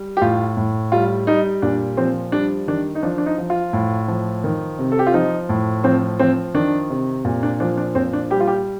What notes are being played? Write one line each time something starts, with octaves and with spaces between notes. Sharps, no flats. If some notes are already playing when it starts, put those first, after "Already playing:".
Already playing: G3
G4
A2 F4
A2
G3 F4
G3 D#4
A#2 D4
F3 C4
G3 D4
D#3 D4
D#4
F3 D4
D4
D#4
F3
F4
A2
F3
D#3
C3
A4
G4
F4
F3 D#4
A2
F3 C4
F3 C4
D#3 D4
C3
A#2
D4
F3 D4
D4
A#2 C4
D4
G3 G4
F4
G4